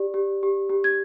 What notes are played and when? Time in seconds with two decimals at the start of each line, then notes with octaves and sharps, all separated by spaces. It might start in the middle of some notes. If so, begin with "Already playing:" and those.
Already playing: G4 D5
0.14 G4
0.43 G4
0.70 G4
0.84 G#6